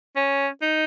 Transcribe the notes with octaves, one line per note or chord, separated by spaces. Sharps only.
C#4
D#4